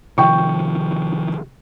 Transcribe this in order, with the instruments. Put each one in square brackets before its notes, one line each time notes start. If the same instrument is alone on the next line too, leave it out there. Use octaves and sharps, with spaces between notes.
[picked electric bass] C3 D#3 F3 [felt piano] G5 C#6